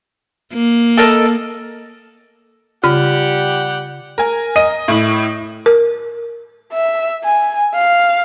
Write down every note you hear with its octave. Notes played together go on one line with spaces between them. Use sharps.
A#3
A4 A#4 D#5
C#3 G3 F4 G4 F#5
A#4 G#5
D#5 D#7
A2 E4 F#7
A#4
E5
G#5
F5